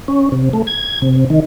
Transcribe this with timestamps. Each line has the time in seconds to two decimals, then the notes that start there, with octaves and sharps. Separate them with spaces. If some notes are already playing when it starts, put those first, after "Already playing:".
0.08 C#4
0.32 C3
0.53 A3
0.67 G#6
1.02 C3
1.30 D#3